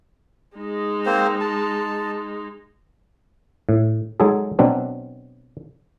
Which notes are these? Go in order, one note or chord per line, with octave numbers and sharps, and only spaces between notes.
G#3 D#4
A#3 C4 C5
A5
A2
F#3 G#3 D#4 G#4 A4
B2 F#3 C4 D4